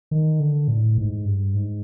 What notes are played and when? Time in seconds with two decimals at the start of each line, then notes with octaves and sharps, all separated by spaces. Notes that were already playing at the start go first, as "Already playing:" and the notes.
0.11 D#3
0.40 D3
0.68 A2
0.98 G#2
1.25 G2
1.54 G#2